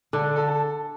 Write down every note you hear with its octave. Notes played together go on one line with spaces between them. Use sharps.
D3 A4
A4
A4